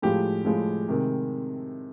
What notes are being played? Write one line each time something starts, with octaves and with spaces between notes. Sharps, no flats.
A2 F3 G#3 G4
A2 F3 G#3
C3 D#3 G#3